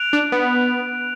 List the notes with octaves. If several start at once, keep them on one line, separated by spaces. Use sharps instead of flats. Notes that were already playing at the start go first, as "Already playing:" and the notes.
Already playing: F#6 D7 F7
D4
B3